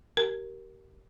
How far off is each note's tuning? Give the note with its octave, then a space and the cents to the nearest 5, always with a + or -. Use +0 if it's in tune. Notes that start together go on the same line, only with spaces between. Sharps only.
G4 -25 A#4 +0